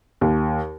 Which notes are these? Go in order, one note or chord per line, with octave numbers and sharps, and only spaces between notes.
D#2